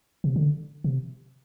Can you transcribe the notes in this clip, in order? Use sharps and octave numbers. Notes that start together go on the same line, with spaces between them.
C3
D3
C3